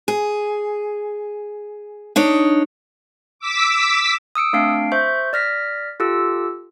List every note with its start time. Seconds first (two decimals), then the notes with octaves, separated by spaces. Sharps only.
0.08 G#4
2.16 D4 D#4 C#5
3.39 D6 E6 B6
4.35 D#6 E6 C#7 D7
4.53 A3 C4 D4 F5 D7
4.92 C5 E5 C#6 G6
5.33 D5 F6 A#6 B6
6.00 F4 G4 A4 E6